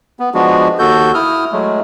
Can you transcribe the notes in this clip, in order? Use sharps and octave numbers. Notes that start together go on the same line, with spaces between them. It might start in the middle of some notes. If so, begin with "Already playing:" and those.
B3
F3 G#3 B3 D4 F#4
D#2 F#4 A4 G6
E4 D#6 F6
F#3 G#3 A3